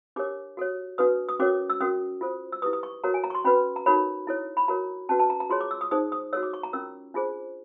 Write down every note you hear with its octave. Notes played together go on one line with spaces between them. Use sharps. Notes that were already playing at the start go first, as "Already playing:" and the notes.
D4 G4 A#4 C#5 D6
F#4 A4 C#5
D4 F#4 B4 D#6
D#6
C#4 F#4 A#4 C#5 D6
E6
C#4 F#4 A#4 D#6
F4 A4 C5
E6
E4 G4 B4 D#6
D#6
C#6
F#4 A#4 C#5 A#5
G#5
A#5
C#6
C6
C#4 F#4 B4 B5
A#5
D#4 F#4 A#4 C#5 B5
E4 A4 C#5
B5
F#4 A#4 C#5 A#5
C#4 F#4 B4 A5
A5
A#5
A#5
F4 G#4 C#5 C6
D6
E6
D#6
D#4 G#4 C5 D#6
D#6
F#4 A4 C#5 E6
D6
C#6
A#5
C#4 F4 A#4 E6
D4 F4 G#4 C5